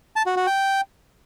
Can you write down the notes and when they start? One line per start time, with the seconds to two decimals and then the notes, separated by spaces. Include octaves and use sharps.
0.16 A5
0.26 F#4
0.36 F#4
0.47 G5